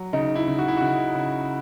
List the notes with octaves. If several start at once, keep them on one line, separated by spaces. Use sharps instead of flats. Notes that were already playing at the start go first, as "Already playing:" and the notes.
Already playing: F#3
C#3 D#4
E4
C#3
F#4
E4
C#3 F#4
C#3